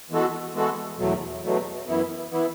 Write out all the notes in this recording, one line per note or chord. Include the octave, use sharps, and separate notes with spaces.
E3 G#3 B3 F#4 A4
E3 G#3 B3 F#4 A4
E2 B2 F#3 A3
E2 B2 F#3 A3
F#2 E3 B3 E4
E3 B3 E4